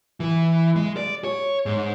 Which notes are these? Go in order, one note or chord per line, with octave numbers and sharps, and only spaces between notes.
E3
G#3
D5
C#5
G#2